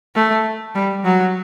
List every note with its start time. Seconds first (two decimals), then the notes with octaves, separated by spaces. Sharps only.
0.15 A3
0.75 G3
1.04 F#3